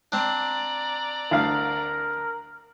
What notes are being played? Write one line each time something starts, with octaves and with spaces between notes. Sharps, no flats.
C4 D4 D5 A#5
D2 A#4 F5